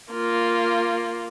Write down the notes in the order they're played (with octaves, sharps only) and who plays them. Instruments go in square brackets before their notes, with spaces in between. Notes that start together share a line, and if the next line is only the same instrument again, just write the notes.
[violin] A#3 F4